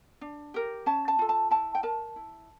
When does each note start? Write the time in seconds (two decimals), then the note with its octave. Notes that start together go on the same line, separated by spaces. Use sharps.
0.21 D4
0.54 G4 A#4
0.86 C#4 A5
1.08 A5
1.19 F4 A4
1.29 A5
1.51 E4 A5
1.75 G5
1.83 A#4 A5
2.16 E4